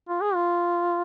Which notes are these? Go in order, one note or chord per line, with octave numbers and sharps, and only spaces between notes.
F4
G#4
F4